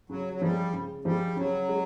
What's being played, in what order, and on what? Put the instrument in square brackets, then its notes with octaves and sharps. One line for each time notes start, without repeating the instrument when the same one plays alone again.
[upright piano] C#3 [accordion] F#3
[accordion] F#3
[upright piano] F3 G#3 [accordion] G3
[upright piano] C#3
[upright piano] F3 G#3 [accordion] G3
[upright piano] C#3 [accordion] F#3
[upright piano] G#3